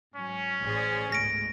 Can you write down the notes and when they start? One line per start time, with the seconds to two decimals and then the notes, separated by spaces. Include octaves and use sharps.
0.16 G#2 F#3 C#4
0.62 A1 A2 G#4 C5 D5
1.12 C#2 G#2 B2 A#6 D7